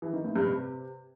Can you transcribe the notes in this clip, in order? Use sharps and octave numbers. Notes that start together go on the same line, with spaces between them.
E3
D#3
A2
G2
C3